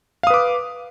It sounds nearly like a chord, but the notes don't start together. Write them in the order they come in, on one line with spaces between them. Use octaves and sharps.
F5 D#6 B4 D6